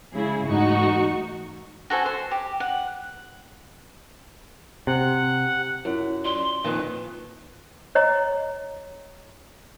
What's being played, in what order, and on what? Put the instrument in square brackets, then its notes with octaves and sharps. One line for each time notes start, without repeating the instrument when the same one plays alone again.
[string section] C#3 G#3 E4 G#4
E2 G#2 A3 D#4 F#4 C#6
[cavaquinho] F#4 A4 C5 G#5
C5
G4
F#5
[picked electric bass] C3 [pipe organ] F#5
[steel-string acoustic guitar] F#2 [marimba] E4 F4 A#4
[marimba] D5 [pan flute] C6
[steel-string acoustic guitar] F2 A#2 D#3 [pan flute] B4
[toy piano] C#5 D#5 A#5